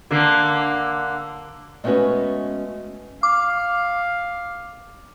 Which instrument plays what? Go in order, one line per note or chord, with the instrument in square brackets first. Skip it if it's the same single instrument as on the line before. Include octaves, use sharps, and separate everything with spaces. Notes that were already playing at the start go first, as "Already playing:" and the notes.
[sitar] D3 A#3
[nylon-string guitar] G#3 A3 B3 C#4 F#4 B4
[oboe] F5 [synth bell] D6